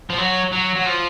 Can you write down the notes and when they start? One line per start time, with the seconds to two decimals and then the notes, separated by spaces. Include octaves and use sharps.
0.10 F3
0.18 F#3
0.52 F#3
0.75 F#3
0.86 F3